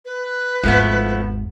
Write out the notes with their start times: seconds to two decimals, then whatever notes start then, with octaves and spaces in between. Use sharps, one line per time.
0.05 B4
0.63 G#1 E2 F3 A3 B3